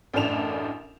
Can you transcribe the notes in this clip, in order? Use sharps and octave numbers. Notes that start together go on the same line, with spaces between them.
A1 F#2 A2 D4 E7 F7